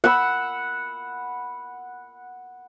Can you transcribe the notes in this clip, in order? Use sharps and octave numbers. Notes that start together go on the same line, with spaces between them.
F#5 B5 E6